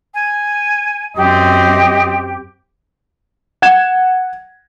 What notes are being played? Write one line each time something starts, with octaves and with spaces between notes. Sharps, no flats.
G#5
F#2 C4 G4 D#5
F#5 G#6 E7